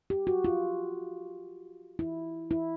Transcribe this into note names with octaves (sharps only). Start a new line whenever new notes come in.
G4
F#4
F4
E4
E4